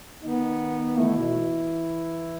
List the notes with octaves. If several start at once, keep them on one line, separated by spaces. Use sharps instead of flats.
D#3 B3 D#4
E3 A3 E4
B2